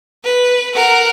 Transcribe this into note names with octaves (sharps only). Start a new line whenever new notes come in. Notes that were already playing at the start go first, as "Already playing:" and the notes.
B4
A#4 F#5